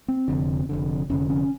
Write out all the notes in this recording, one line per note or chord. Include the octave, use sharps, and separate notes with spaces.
C4
F1 F2 D3
F1 F2 D3
F1 F2 D3 C#4
C#4